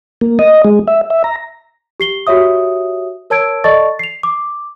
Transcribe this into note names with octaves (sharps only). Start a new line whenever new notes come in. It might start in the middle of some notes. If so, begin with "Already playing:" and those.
A#3
D#5
G#3
E5
E5
A#5
G4 C7 G7
F#4 G4 C#5 E5 D#6
A#4 C#5 A5 E6 G#6 D7
A4 D5 D#5 A5 C#6 A6
C7 F7
D6